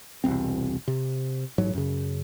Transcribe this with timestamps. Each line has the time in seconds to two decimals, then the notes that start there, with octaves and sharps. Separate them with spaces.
0.24 E1 C2 C4
0.88 C3
1.58 A1 G#2 F#3
1.74 F#2 C#3